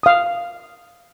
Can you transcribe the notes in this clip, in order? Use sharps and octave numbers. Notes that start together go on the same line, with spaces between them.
F5 D#6